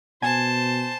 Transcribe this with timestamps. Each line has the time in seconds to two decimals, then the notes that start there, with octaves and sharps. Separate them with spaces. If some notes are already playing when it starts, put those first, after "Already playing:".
0.22 B2 C5 G#5 A5